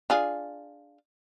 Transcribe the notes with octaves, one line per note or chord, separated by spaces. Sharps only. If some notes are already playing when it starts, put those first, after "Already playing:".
D4 F4 G#4